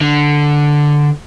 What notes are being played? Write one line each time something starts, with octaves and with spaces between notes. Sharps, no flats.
D3